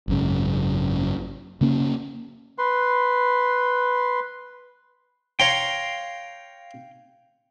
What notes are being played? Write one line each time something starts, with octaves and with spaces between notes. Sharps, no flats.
G#1 F#2 C#3
C#3 A#3 C#4
B4 C6
C#5 F5 G5 A#5 C6